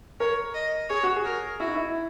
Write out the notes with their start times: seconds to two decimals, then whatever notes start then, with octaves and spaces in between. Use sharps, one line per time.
0.20 A#4 C#5
0.54 D#5
0.89 G#4 C#5
1.03 F#4
1.16 G#4
1.25 A#4
1.60 E4 F#4
1.68 D#4
1.75 E4